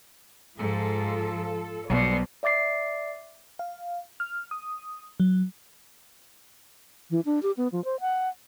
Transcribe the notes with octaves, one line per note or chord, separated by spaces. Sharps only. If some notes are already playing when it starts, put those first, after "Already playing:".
G#2 F3 F4 A4
B1 B2 F#3 G3 C5 D5
D5 E5 D6 A6 C7
F5
F6
D#6
F#3
E3
D4
G4
B3
F3
C5
F#5